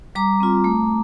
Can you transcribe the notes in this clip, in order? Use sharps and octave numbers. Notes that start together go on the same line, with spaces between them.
G3 A#5 D6
C4 F4
A3